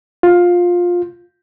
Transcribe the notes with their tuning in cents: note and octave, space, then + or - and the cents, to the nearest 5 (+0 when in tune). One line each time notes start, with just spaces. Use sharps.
F4 +15